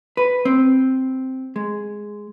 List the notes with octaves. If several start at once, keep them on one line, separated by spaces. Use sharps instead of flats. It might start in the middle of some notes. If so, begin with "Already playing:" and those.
B4
C4
G#3